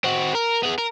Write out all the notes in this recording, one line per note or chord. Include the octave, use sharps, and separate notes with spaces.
C4 F#4
A#4
B3 G#4
A#4